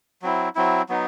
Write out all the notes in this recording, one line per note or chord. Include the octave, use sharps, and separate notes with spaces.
F#3 C4 E4
F#3 C4 E4
F#3 B3 D#4